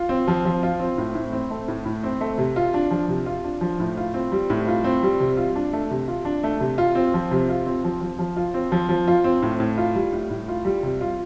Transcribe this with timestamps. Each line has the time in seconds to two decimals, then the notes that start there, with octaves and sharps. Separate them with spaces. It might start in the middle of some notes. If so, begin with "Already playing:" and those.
Already playing: F4
0.09 C4
0.28 F3
0.45 F3
0.63 F4
0.80 C4
0.98 A2
1.15 A2
1.32 C4
1.50 A3
1.68 A2
1.86 A2
2.04 C4
2.21 A3
2.38 C3
2.56 F4
2.74 D4
2.91 F3
3.08 C3
3.26 F4
3.44 D4
3.61 F3
3.80 A2
3.97 F4
4.14 C4
4.32 G3
4.50 A2
4.67 F4
4.84 C4
5.03 G3
5.20 C3
5.37 F4
5.55 D4
5.73 A3
5.91 C3
6.08 F4
6.25 D4
6.43 A3
6.60 C3
6.78 F4
6.95 C4
7.14 F3
7.31 C3
7.49 F4
7.66 C4
7.84 F3
8.01 F3
8.19 F3
8.36 F4
8.54 C4
8.72 F3
8.89 F3
9.08 F4
9.24 C4
9.43 A2
9.60 A2
9.78 F4
9.95 G3
10.13 A2
10.30 A2
10.48 F4
10.65 G3
10.83 C3
11.01 F4